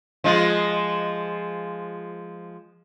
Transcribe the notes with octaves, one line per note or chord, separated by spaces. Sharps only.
F3 G#3 F4